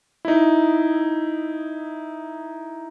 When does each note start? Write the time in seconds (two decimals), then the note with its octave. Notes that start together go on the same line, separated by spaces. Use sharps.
0.25 D#4 E4